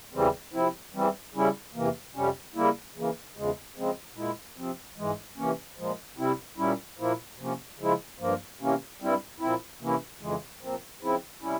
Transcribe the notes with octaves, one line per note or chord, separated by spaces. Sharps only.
E2 C#3 E3 G3 C4
C3 F3 C4 E4
E2 E3 G3 C4
C#3 G3 C#4 E4
E2 C3 E3 A#3
F2 C3 G3 C#4
C#3 G3 A#3 E4
C#3 E3 A#3
E2 C#3 F3 G#3
C#3 F3 G#3 C4
A#2 G#3 E4
C3 F3 C4
G#2 E3 G#3
C3 E3 A#3 C#4
A#2 F3 G#3
C3 G3 C4 E4
A#2 G3 C#4 E4
A#2 F3 A#3 E4
C3 F3 A#3 C#4
C#3 F3 G#3 E4
G2 F3 A#3
C3 E3 A#3 C#4
G2 G3 C4 E4
A#2 F3 C4 E4
C3 E3 A#3 C#4 E4
F2 C#3 E3 G#3
A#2 F3 C4
C#3 F3 C4 E4
C3 G3 C#4 E4